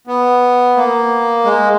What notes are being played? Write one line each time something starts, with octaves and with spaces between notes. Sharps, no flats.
B3
A#3
G#3